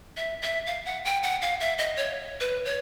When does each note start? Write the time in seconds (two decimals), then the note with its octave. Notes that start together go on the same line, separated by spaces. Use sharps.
0.17 E5
0.42 E5
0.67 F5
0.85 F#5
1.05 G5
1.23 F#5
1.42 F5
1.60 E5
1.78 D#5
1.97 C#5
2.40 B4
2.65 C#5